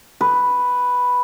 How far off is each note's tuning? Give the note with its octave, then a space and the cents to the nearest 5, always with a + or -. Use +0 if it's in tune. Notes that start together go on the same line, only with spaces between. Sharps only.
B4 +0